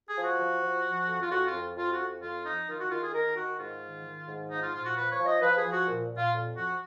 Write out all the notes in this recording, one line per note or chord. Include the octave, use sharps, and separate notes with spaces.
G#4
F3
F#4
F3
F3
F3
F2
F4
F2 F#4
F4
F2
F2 F4
F#4
F2
F2 F4
F3 D#4
D#3 F4
F#4
D#3 F4
G#4
D#3 A#4
D#3 F#4
G#2 F4
D#3
D#3
G#2
F3 D#4
F4
A#2 F4
F#4
F3 B4
C#5
F3
D#5
F3 B4
G#4
F3
F#4
A#2
A#2
F4
F2
F3 F#4